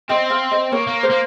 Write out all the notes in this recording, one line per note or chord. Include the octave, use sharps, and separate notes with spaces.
C4 D#5
F5
D#5
A#3 C#5
A#3
C5
A#3